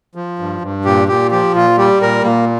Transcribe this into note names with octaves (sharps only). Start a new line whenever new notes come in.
F3
G2
G2
A#2 G4
A#2 G4
F3 G4
A#2 F4
G3 G4
A#2 A#4
A#2 A#3